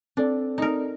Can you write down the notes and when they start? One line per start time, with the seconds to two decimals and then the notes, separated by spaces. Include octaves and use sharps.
0.17 C4 D4 A4 D5
0.58 D#4 A#4